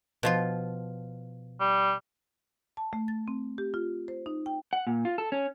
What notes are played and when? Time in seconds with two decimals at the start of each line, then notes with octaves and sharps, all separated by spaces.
0.23 B2 F3 F4
1.60 G3
2.77 A5
2.93 A3
3.08 A6
3.28 C4
3.58 G4
3.74 F4
4.08 C5
4.26 D#4
4.46 G5
4.73 F#5
4.87 A#2
5.05 F4
5.18 A4
5.32 C#4